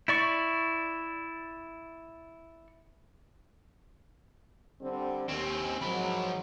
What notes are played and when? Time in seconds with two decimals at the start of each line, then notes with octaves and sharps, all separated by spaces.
0.08 E4 D5 C#6
4.81 D3 G3 C4
5.28 D#2 C4 C#4
5.81 G#2 F3 F#3 B5